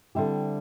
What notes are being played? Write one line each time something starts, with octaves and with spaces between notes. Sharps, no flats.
D3 G3 C4 E4 G4